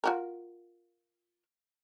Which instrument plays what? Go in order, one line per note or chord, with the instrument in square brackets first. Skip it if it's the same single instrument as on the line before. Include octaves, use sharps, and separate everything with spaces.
[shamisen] F4 F#4 A#4